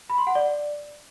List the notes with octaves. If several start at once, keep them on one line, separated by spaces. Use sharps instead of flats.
B5
C6
F#5
D5